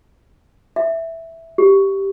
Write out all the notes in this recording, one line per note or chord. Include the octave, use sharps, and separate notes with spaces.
E5
G4